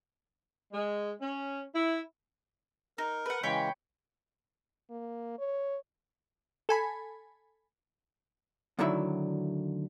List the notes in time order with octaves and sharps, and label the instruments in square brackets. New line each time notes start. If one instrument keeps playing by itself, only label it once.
[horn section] G#3
C#4
E4
[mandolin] D#4 [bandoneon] A#4
[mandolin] B4 F#5
[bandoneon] C#3 E3 G#3 [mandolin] C#5 G5 B5
[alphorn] A#3
C#5
[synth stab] A4 G#5 B5
[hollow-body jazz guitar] D2 D3 D#3 F#3 E4 E5